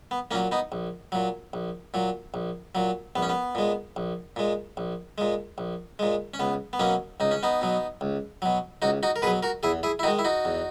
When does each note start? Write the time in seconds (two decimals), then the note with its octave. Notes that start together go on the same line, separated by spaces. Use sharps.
0.11 B3
0.31 A#2 F#3 A#3 C#4
0.52 B3 D#4
0.72 A#1
1.12 A#2 F#3
1.53 A#1
1.94 A#2 F#3
2.34 A#1
2.75 A#2 F#3
3.16 A#1 B3
3.22 C#4
3.29 B3
3.55 A#2 G#3
3.96 A#1
4.36 A#2 G#3
4.77 A#1
5.18 A#2 G#3
5.58 A#1
5.99 A#2 G#3
6.34 C#4
6.40 C#2 B3
6.73 B3
6.79 B2 F#3 A#3 C#4
7.20 C#2 D#4
7.31 C#4
7.43 B3 D#4
7.61 B2 F#3
8.01 C#2
8.42 B2 F#3
8.82 C#2 D#4 F#4
9.03 D#4 F#4
9.16 A#4
9.22 B2 G#4 B4
9.27 F#3
9.43 F#4 A#4
9.63 E2 E4 G#4
9.83 E4 G#4
9.99 E4
10.03 D#3 G#3 D#4 F#4
10.19 E4
10.25 D#4 F#4
10.45 E2